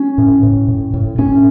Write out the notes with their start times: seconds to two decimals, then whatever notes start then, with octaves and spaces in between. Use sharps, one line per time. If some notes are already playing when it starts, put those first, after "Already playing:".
Already playing: C#4
0.18 A2
0.43 A2
0.68 A2
0.94 A2
1.18 A2 C#4